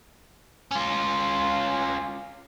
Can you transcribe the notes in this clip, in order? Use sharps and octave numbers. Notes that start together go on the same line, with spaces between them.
C#4 F4